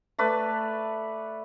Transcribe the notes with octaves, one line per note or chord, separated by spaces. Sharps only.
A3 B4 D5